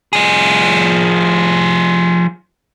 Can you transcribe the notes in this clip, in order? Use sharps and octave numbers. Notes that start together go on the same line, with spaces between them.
F3 G#4